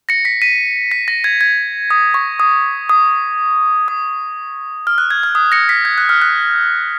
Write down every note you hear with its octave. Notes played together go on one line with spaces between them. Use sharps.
A#6 C#7
B6
B6 D#7
B6
A#6
G#6
G#6
D#6
C#6
D#6
D#6
D#6
F6
F#6
G#6
F6
D#6
A#6 C#7
B6
G#6
F#6
F6
F#6